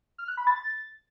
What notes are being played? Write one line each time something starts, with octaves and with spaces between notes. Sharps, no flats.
F6
F#6
B5
A6